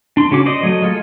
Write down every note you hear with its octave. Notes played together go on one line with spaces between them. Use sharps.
D4 C6
C#3 C#4 F#4 D6
C5 D5 D#5
F#3 A3 D#5
G#3 F4 A4